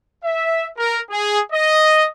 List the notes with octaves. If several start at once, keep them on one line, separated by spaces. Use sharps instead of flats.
E5
A#4
G#4
D#5